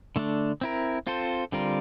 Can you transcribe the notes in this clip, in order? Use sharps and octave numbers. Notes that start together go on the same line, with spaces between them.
D3 A3 D4
C4 E4 A#4
C4 F4 A4 C5
D3 G3 C4 F4 A#4